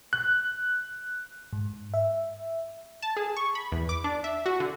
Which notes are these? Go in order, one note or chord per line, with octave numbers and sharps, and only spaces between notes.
F#6
G#2
E5
A5
G#4
C#6
B5
E2
D6
D4
E5
F#4
D3